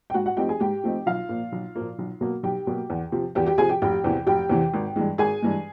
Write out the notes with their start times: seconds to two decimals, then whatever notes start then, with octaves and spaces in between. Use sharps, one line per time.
0.10 G5
0.14 G#2 F#4 F#5
0.26 F#4 F#5
0.37 F3 A3 C4 D#4 G4 G5
0.49 G#4 G#5
0.60 G#2 G4 G5
0.84 F3 A3 C4 D#4
1.06 B1 F4 F5
1.29 A#2 F3 A#3
1.52 B1
1.75 A#2 F3 A#3
1.99 B1
2.21 B2 F#3 A#3
2.43 B1 G4 G5
2.67 B2 F#3 A#3
2.90 E2
3.12 C3 F3
3.35 E2 G4 G5
3.46 G4 G5
3.58 C3 F3 G#4 G#5
3.69 G4 G5
3.82 F1 G4 G5
4.04 E2 C3 E3
4.27 F1 G4 G5
4.49 E2 C3 E3
4.74 G#1
4.96 G2 E3 G#3
5.18 G#1 G#4 G#5
5.42 G2 E3 G#3